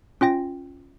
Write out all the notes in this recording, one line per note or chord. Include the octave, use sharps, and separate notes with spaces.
C#4 F4 G5 A#6